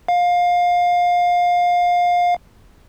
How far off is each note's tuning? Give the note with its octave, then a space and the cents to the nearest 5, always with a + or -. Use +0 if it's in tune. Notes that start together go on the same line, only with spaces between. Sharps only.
F5 +20